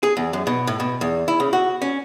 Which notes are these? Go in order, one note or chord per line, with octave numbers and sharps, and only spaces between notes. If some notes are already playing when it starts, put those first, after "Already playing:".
G#4
E2
F#2
B2
A2
B2
E2
E4
C#3
F#4
C#4